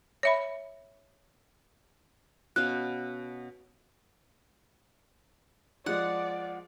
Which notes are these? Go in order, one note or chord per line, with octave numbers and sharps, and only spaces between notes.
C#5 E5 B5
B2 C#4 F5 F#6
F3 G#3 D5 F#5